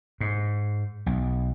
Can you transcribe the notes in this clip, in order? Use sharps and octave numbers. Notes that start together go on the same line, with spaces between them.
G#2
B1